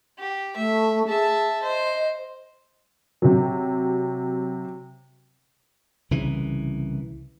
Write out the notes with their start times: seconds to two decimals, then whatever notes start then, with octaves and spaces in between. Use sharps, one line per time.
0.19 G4
0.57 A3 E5
1.08 G#4 E5 A5
1.62 C5 D#5
3.22 C3 F#3
6.11 C2 C#3 E3